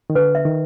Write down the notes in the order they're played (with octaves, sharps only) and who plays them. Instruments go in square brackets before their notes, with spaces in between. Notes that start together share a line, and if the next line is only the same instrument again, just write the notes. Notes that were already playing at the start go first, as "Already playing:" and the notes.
[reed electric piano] D#3
[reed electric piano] D3 [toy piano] B4
[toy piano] E5
[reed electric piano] D#3